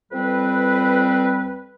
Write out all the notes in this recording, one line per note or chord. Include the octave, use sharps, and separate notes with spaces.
F2 G3 C4 B4